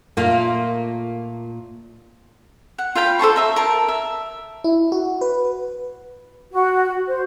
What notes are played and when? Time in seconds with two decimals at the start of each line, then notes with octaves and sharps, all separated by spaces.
0.17 A#2 A3 A#3 F4
2.78 F#5
2.95 F4 F5 G5 B5
3.19 A4 C5 A5 C#6
3.36 F4 E5 A#5
3.56 A#4 A5
3.88 E5
4.64 E4
4.92 F#4
5.21 B4
6.52 F#4
7.07 C5